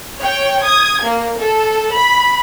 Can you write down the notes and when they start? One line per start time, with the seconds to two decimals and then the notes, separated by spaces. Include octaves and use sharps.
0.19 C#5 G5
0.66 D#6 G#6
1.05 A#3
1.39 A4
1.97 B5